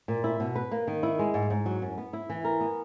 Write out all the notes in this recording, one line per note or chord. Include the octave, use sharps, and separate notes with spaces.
A#2
E4
B2
B4
A#3
D#3
E4
G#3
G#2
G#2
F#3
F#2
B3
E4
E3
A#4
B3